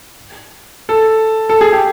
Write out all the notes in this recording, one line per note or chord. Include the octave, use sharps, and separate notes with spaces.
A4
A4
G#4
G4